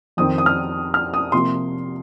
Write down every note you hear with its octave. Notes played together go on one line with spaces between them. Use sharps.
F2 D#3 C4 D#6
D#6
F6
F6
D#6
C3 F3 A#3 C6